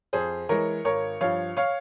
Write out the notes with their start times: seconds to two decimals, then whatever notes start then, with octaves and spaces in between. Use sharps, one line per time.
0.13 F2 G#4 C5
0.49 E3 G#3 A#4 C#5
0.85 G#1 A#4 C#5
1.21 G2 F3 C#5 F5
1.57 C#5 F5